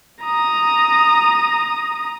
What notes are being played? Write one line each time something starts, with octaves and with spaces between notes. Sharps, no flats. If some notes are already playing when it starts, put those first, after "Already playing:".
A#5 D#6